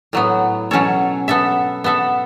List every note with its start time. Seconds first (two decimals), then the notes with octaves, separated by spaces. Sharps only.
0.13 A2 F#3 B3
0.71 B2 F#3 C#4 A4 C#5
1.28 B3 A4 E5
1.84 B3 A4 E5